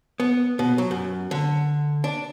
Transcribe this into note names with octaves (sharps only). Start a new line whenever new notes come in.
B3
B2
F#3
F#2
D3
D4